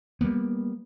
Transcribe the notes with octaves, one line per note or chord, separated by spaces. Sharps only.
G3 G#3 A#3 B3